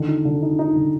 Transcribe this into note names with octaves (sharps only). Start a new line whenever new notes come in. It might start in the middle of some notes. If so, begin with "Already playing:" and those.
Already playing: D3 D#3
D#4
D3
D#4
D#4
D3